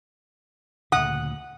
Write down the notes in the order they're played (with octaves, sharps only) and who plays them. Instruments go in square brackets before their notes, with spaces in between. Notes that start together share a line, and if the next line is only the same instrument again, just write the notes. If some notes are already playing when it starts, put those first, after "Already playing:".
[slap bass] D2 A#2 C#3 [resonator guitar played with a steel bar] F#5 [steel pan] D#6